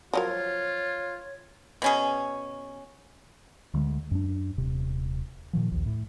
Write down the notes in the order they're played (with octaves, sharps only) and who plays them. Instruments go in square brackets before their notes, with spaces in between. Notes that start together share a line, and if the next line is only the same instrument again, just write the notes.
[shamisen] F3 F#3 A#4 [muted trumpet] F4 [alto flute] C#5
[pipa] B2 C#4 G#4
[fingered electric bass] D2 D3 G#3
F#2 D4
D#1 C3
A#2 D#3 F3
A#1 D#2
A2